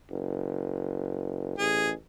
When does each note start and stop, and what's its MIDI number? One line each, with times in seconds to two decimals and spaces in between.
0.10 1.53 30
1.58 1.93 33
1.58 1.90 68